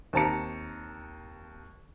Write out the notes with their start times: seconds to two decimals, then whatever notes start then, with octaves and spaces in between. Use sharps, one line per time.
0.13 D#2 C4 A5 A#5 C#7